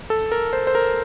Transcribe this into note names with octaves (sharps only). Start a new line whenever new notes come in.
A4
A#4
C5
C5
A#4